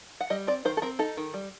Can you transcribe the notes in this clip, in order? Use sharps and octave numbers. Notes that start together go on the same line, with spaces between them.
F#5
G3 D#5
C4 D5
D#3 C5
A4
C4 A#4
D#4 A4
D#3
G3